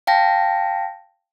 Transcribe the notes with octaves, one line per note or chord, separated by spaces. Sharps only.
F5 G5 A5 A#6